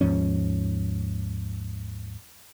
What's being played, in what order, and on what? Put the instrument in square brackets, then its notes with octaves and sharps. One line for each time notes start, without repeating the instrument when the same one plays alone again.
[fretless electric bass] D#2 G#2 F3 C#4